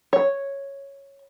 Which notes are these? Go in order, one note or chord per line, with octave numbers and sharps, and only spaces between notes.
C#5